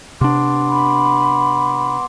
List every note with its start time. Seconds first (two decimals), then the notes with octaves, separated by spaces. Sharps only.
0.21 C3 B3 D4 C6 D6
0.69 B5